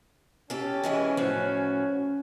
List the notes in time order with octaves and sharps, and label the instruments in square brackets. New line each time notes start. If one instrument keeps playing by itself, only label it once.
[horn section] C#4 [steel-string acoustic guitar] G4 A4
[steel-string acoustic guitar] E3 G#3 E4
A2 F3 F#4